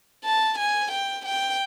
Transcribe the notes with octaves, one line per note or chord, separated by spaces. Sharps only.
A5
G#5
G5
G5